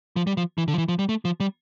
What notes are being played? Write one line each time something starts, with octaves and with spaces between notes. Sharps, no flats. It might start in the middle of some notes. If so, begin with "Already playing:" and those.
F3
G3
F3
E3
D3
F3
E3
F3
G3
A3
F3
G3